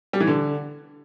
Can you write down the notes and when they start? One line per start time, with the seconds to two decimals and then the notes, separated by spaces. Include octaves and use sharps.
0.13 G3
0.20 E3
0.28 D3